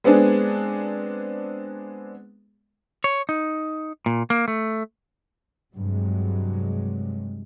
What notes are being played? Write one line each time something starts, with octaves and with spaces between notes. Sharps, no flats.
G#3 B3 C4 D4 G#4
C#5
D#4
A#2
A#3
A3
G2 C3 F#3 G#3